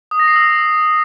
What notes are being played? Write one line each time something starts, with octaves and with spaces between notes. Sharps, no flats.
D#6
A#6
C7
E6